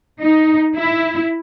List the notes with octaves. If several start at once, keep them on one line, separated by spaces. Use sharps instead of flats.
D#4
E4